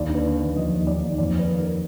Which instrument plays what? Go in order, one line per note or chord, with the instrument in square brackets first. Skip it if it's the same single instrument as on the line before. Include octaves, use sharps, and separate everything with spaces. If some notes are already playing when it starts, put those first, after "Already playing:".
Already playing: [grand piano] D#2 D5
D3
B4
D3
D#2 B4
F3 D#5
D#2
D#2 D5
D#2
F2 D5
D#3 B4
D#3
A#4